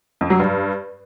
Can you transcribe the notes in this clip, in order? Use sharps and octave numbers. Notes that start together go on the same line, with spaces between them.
F2
F#3
G2